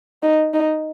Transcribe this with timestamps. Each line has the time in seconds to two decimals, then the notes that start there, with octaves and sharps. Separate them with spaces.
0.23 D#4
0.54 D#4